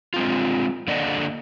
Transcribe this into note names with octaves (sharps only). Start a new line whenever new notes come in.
G#3 C4 F4
D3 A#3 D5 D#5 F#5